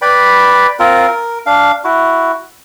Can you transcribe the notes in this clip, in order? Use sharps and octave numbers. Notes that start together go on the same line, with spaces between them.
B4 D5 G5 B5
C4 F4 A#4
A#4
D4 F5
E4 F#4